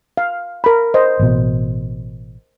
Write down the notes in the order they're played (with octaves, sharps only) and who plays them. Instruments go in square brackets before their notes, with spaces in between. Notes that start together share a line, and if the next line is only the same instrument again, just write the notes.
[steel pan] F5
A#4 B5
C5 D#5
[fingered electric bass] A1 B2